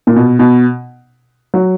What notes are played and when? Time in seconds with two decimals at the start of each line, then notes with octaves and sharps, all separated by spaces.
0.07 A#2
0.16 B2
0.39 B2
1.54 F#3